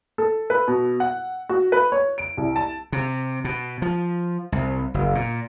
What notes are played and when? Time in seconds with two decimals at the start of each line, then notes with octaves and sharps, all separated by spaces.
0.18 A4
0.50 B4
0.67 B2
1.00 F#5
1.49 F#4
1.72 B4
1.92 C#5
2.18 D7
2.37 C2
2.56 A5
2.92 C3
3.44 B2
3.82 F3
4.52 C2
4.94 F#1
5.15 A#2